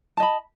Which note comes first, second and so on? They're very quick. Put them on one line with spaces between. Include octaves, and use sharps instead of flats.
A5 D#5 B5